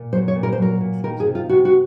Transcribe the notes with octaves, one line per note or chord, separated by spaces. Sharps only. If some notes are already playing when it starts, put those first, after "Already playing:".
Already playing: A#2
F#3 C5
C#5
A#2
A#4
C5
F#3 A#4
A#2
D#3 A#4
G#4
C3
F4
C3 F#4
F#4